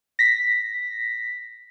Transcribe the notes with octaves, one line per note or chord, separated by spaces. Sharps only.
A#6 B6